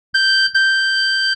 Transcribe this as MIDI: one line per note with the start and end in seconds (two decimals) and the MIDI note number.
0.14 0.46 91
0.54 1.33 91